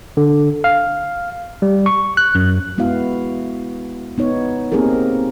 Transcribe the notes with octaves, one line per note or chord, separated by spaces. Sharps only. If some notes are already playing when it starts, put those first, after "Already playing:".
D3
F5
G3
C#6
F#6
F#2
G#3 B3 E4 F#4 F5
B3 D#4 C#5
A#3 C4 D#4 G4 G#4 A#4